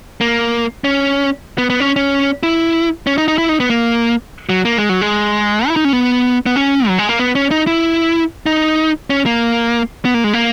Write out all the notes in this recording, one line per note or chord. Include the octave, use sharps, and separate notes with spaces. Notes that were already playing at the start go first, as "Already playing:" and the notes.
A#3
C#4
B3
B3
C#4
C#4
E4
C#4
D#4
D#4
E4
D#4
B3
A#3
F#3
A#3
G#3
F#3
G#3
E4
D#4
C#4
B3
B3
C#4
F#3
G#3
A#3
B3
C#4
D#4
E4
D#4
C#4
A#3
B3
A#3
G#3
A#3